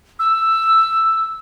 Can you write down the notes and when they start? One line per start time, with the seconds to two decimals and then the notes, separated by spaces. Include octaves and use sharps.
0.19 E6